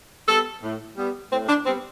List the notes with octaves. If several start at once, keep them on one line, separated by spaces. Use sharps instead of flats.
G3 B3 A4
A2
G3 B3
A2 C4
D4
G3 B3 C4